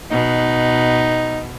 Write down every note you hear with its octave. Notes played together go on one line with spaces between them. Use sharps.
B2 D#4